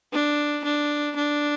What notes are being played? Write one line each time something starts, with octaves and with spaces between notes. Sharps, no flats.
D4
D4
D4